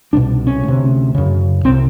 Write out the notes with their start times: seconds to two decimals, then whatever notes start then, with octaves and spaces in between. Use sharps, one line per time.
0.13 C2 B2 D4
0.47 C#4
0.63 D2 C3
1.15 F#2 C#3
1.64 C2 C4
1.68 C3